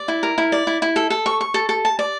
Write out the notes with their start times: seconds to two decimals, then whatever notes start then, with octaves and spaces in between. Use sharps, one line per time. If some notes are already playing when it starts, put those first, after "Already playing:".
Already playing: D5
0.08 E4
0.23 A#4
0.38 E4
0.52 D5
0.67 E4
0.82 E4
0.96 A4
1.10 A4
1.26 C#6
1.41 C#6
1.54 A4
1.69 A4
1.85 A5
1.99 D5